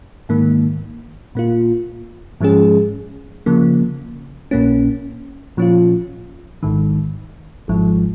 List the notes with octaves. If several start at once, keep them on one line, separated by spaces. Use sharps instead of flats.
G#2 D#3 A#3
A#2 A#3 F4
G#2 F3 G#3 C#4 G#4
C#3 F3 A#3
A#1 A#2 A#3 C#4
A#2 F3 C#4 F4
G#1 G#2 D#3
G#1 G#2 F3